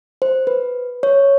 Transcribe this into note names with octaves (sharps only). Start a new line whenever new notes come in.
C5
B4
C#5